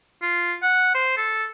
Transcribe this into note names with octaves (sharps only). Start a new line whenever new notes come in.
F4
F#5
C5
A4